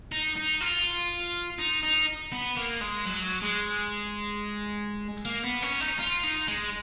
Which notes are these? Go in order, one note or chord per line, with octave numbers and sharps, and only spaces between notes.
D#4
D#4
F4
D#4
D#4
B3
A#3
G#3
F#3
G#3
A#3
B3
C#4
D#4
F4
D#4
G#3